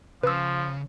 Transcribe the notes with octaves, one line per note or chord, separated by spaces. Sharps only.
C#3 F3 B4 E6